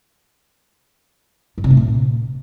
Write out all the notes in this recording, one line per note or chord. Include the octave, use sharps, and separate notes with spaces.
G2
C3
A3
A#2